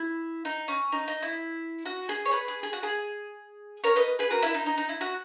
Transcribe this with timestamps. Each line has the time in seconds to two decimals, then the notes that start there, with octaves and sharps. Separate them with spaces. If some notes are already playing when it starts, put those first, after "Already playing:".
Already playing: E4
0.45 D#4
0.68 C#4
0.92 D#4
1.08 D#4
1.22 E4
1.85 F#4
2.09 G#4
2.25 C#5
2.32 G#4 B4
2.48 G#4
2.63 G#4
2.73 F#4
2.83 G#4
3.84 A#4 C#5
3.96 B4 D#5
4.19 G#4 B4
4.31 F#4 A#4
4.42 E4
4.54 D#4
4.66 D#4
4.78 D#4
4.89 E4
5.01 F#4